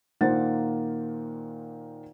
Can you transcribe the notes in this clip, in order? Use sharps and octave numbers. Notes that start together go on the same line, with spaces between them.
A#2 D#3 A#3 C5 F#5 A6